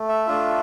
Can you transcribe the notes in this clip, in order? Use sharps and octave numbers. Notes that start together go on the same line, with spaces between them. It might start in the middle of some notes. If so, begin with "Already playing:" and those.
Already playing: A3
E5
A3 D4 F4